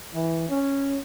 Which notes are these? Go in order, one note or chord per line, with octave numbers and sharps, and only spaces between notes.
E3
C#4